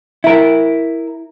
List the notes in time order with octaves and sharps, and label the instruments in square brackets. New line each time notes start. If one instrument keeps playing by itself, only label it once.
[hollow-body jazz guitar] E4 A#4